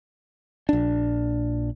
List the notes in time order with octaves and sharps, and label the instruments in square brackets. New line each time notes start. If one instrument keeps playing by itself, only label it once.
[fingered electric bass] A#1 D4